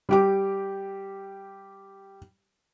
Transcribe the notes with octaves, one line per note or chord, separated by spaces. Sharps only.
G3 G4 D6